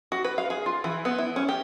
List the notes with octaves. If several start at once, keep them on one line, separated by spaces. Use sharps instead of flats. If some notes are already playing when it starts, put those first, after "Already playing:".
F#4
B4
F5
G#4
F4
E3
B3
E4
C#4
G4